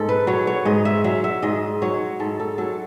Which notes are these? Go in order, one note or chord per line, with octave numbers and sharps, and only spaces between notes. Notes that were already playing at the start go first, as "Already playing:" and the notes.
Already playing: G#2 A4
B4
F#3 C#5
C#5
G#2 D#5
E5
F#3 E5
E5
G#2 D#5
F#3 C#5
G#2 A4
A4
F#3 A4